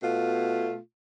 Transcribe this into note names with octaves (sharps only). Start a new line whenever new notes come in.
B2 A3 F4